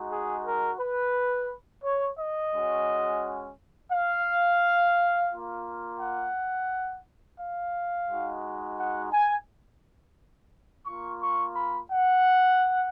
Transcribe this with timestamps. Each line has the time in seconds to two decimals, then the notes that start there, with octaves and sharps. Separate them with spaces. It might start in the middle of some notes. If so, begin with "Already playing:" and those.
Already playing: G#3 D#4 F#4
0.10 G#4
0.44 A#4
0.79 B4
1.83 C#5
2.18 D#5
2.53 G#3 C#4 F#4
3.91 F5
5.30 A#3 F4
6.00 F#5
7.39 F5
8.08 G#3 D#4 F#4
8.78 F#5
9.12 G#5
10.86 A#3 F4 C#6
11.20 C#6
11.55 B5
11.90 F#5